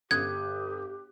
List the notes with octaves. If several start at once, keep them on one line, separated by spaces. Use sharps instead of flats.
G1 G4 D#6 F#6 G#6